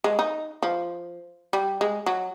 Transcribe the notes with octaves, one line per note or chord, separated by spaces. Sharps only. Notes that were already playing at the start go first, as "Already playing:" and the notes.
G#3
D#4
F3
G3
G#3
F#3